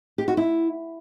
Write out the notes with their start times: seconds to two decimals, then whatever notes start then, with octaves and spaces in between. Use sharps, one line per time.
0.18 G4
0.28 F#4
0.37 E4